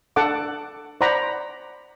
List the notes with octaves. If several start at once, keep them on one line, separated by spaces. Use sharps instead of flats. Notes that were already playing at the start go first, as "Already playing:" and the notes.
D4 A4 F#5 A5 D6
C5 D5 F#5 A#5 B5 D6